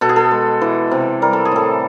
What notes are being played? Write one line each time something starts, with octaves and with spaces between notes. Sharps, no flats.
B2 A4
G#4
A4
G#3
E3
C3
G3 A#4
A4
G#4
A2 A4